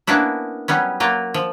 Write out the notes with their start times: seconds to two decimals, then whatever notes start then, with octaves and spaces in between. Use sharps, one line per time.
0.07 A#3 B3 C#4 D4 E4
0.68 F#3 G3 B3 C#4
1.00 F#3 A#3 F4
1.34 F3